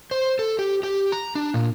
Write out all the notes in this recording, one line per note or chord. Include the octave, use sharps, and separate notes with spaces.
C5
A4
G4
G4
A#5
D4
A#2